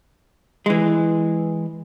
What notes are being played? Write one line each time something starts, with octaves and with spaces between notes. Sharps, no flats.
E3 G#3